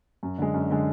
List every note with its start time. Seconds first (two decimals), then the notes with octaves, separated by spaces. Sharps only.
0.23 F#2
0.38 D3 G#3
0.54 F#2
0.70 D3 G#3